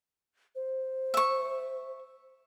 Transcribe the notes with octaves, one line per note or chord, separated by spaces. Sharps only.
C5
E5 C#6